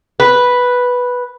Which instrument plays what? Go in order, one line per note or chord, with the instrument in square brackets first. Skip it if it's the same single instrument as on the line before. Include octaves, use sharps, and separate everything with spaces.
[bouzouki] B4